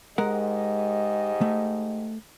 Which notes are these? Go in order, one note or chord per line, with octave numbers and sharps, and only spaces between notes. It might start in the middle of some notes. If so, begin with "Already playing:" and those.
G#2 G#3 G4 A#4 D#5 F#5
A3